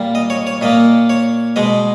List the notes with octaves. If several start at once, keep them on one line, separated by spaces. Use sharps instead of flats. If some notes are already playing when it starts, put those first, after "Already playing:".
Already playing: A#2 G3 A#3
D#5
C#5
C#5
A#2 A#3 D#5
C#5
B2 G#3 D#5